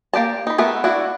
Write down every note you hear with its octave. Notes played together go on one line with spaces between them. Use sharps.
A#3 G4 D5 A5
D#4 B5
A3 B3 A#4 E5
D4 E4 F#4